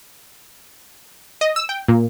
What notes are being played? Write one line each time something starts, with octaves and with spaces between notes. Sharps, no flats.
D#5
E6
G5
A#2